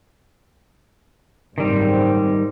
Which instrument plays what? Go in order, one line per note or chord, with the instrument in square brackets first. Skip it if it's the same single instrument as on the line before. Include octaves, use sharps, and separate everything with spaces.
[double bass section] F#1 G#2 C4 [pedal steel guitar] D#3 G3